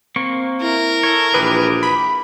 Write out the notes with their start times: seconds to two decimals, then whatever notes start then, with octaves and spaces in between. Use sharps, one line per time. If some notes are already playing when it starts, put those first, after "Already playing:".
0.16 A#3 C4 C#6
0.62 E4 A#4
1.03 A4 C#5
1.34 A#1 E3 G4 G#4 B4
1.83 B5